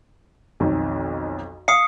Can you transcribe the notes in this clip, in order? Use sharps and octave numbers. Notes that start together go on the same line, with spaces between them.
B1 F2 D#3
F5 D#6 C7 C#7